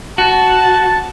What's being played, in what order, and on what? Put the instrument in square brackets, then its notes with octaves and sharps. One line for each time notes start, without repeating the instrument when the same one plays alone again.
[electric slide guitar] F#4 [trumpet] A5